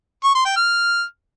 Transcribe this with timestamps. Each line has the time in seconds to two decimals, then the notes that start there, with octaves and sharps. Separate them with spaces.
0.24 C#6
0.35 C6
0.46 G5
0.56 F6